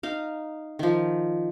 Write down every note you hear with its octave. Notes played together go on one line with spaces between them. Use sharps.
D#4 F5
D#3 F3